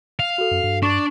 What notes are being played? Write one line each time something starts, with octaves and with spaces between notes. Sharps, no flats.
F5
F#4 A4
F#2
G2
D4 C#6